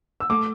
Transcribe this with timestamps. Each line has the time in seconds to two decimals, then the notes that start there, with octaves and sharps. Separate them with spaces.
0.20 E6
0.30 A3 D6